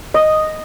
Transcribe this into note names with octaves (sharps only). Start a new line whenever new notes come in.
D#5